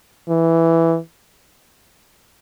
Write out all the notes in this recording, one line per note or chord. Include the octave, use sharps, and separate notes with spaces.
E3